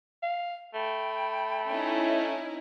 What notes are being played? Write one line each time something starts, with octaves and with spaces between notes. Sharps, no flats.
F5
A3 G5 B5
C#4 D#4 E4